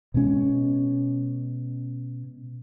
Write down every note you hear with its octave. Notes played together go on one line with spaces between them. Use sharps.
B2 G#3 C#4